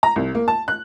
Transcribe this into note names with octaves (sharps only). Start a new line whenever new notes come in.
A#5
C2
A#3
A5
F#6